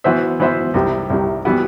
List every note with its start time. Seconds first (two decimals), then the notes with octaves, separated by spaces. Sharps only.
0.04 E3 B3 F#4 C5 E5
0.40 E3 B3 F#4 C5 E5
0.74 C2 C3 G3
1.10 C2 C3 G3
1.45 E3 G3 B3 F#4